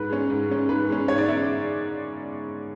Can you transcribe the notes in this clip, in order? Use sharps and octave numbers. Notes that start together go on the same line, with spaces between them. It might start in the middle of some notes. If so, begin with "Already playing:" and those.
Already playing: G#2 B4
G#3 C#4
G#2
G#3 C#4
G#2 B4
G#3 C#4
G#2 C#5
D5
G#3 C#4 E5